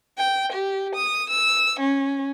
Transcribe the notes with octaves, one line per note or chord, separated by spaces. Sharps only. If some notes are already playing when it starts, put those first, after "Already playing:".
G5
G4
D#6
E6
C#4